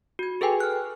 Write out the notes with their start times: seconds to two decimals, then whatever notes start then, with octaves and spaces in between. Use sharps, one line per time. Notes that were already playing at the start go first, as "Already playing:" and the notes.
0.19 F#4 G#6
0.41 G#4 A4 B4 G5 G#5
0.60 F6 F#6